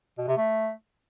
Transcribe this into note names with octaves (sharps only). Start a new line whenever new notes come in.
B2
C3
A3